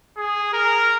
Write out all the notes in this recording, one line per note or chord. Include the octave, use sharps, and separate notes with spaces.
G#4
A#4